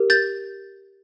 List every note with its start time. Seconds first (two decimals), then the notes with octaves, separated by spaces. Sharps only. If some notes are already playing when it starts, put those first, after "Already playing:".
Already playing: G4 A#4
0.10 G6 A6